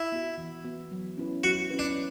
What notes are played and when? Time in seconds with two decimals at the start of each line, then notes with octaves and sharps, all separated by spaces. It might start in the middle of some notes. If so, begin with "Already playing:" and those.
Already playing: E4
0.12 B3 F#4
0.38 E3
0.64 B3 F#4
0.92 F#3
1.17 C#4 E4 B4
1.44 F#3 F#4
1.71 C#4 E4 B4
1.79 D4